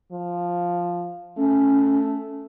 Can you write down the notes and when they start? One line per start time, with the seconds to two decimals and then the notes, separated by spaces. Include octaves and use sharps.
0.12 F3
1.38 A3 C#4